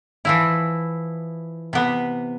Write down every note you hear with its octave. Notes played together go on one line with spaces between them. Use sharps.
E3 F3 E4
C3 B3